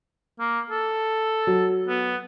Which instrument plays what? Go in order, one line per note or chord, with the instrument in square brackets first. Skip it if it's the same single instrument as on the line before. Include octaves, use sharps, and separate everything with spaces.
[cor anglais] A#3
A4
[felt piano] F#3
[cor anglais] B3